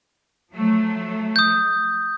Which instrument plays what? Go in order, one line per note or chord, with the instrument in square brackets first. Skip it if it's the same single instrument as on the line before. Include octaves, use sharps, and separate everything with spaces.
[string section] F3 F#3 A3
[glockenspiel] D#6 G6